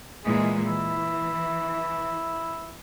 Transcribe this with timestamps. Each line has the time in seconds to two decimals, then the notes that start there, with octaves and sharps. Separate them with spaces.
0.24 A#2 E3 G#3 G#4
0.65 E3 E4